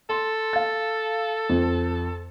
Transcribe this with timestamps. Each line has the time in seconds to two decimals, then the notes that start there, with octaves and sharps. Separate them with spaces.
0.10 A4 C6
0.53 F5 A6
1.49 F2